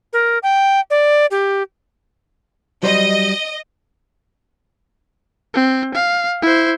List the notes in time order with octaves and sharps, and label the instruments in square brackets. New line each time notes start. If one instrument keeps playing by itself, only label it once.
[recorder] A#4
G5
D5
G4
[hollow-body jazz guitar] F#3 G3 C5 [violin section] D#5
[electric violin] C4
F5
E4 C5